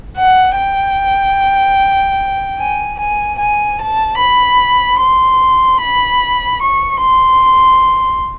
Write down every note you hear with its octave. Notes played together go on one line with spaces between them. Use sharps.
F#5
G5
G#5
G#5
G#5
A5
B5
C6
B5
C#6
C6